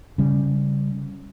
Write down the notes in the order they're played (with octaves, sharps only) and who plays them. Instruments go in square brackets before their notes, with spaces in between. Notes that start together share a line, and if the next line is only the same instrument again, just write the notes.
[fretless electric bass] C#3 G3